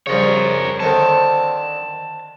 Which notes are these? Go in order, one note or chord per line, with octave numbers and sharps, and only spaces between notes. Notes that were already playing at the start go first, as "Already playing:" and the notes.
C#3 F3 G3 A#4 C#5
D3 D#3 C4 A5